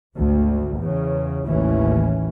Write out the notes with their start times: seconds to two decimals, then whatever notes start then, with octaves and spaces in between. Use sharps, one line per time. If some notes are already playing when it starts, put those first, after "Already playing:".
0.16 G#1 D2
0.78 E2 C#3
1.46 A1 D#2 C#3 E3 G3 C#4